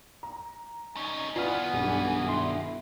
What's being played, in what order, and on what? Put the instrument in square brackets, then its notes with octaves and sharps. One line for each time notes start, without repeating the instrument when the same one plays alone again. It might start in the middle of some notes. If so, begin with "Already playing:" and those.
[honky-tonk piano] A#5
[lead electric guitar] C2 C#4 [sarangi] D#4
[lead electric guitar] D#3 B3 [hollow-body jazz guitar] E4 F4 D5 [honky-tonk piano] B4 F6 [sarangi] G#5
[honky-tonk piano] B1 G2 [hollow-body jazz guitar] G3
[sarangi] E4 [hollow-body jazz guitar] C6